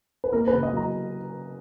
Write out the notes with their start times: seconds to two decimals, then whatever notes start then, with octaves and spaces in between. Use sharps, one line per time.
0.24 B4
0.33 A#3 A#4
0.48 B4
0.53 C#3
0.63 D#5
0.73 F#3 A#5